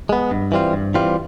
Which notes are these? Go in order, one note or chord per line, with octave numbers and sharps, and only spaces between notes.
G#3 B3
G2
E3 G3 C4 F4
G2
E3 G3 C4 F4